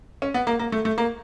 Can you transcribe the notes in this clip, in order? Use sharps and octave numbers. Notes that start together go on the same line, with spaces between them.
C#4
B3
A#3
A#3
A3
A3
A#3